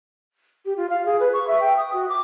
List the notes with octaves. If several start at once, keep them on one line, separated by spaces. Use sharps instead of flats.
G4
F4
F5
G#4
B4
C#6
E5
G5
D#6
F#4
D6